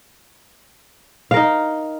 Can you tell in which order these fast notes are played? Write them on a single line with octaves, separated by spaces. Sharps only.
F5 A#4 D#4